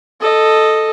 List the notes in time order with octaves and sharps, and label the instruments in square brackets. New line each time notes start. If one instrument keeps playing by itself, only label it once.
[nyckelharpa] A4 D#5